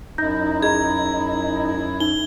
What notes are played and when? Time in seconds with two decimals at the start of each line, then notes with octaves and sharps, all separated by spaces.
0.18 F#2 D#4 E4 G6 A#6
0.62 G#4 D#5 A#5 G#6
2.00 D#4 G7